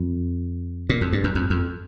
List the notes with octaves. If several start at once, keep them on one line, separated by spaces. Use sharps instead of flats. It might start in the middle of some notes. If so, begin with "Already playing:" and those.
Already playing: F2
A#2
F2
G2
F#2
F2
F2